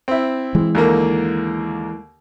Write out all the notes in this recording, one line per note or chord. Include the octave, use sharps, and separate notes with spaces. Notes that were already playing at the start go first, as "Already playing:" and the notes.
C4 E4
E3 G#3
D#2 D3 A#3